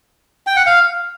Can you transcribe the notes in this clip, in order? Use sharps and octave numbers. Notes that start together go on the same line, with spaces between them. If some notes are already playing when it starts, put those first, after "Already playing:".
G5
F#5
F5